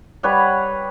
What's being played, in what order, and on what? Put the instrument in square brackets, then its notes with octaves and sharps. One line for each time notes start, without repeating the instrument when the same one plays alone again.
[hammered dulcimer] G3 B4 C#5 F#5